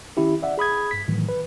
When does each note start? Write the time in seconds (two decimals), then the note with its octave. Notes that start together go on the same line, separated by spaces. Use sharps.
0.17 D#3 C#4 E4 G4
0.42 D5 E5 F#5
0.58 G#4 B5 D#6 G#6
0.91 G2 B6
1.08 A2 D#3 E3 F#3
1.29 B4